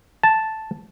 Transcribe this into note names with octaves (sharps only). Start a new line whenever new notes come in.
A5